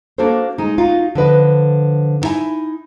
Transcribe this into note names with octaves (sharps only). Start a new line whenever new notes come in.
A#3 D4 F#4 A4 C5
G#3 D#4
D#4 F4 F#4
D3 F3 B4 D#5
B3 D#4 E4 E5 G#5